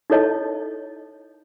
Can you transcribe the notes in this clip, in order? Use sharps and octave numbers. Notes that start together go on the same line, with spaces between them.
D#4 E4 A4 C#5 D#5 A5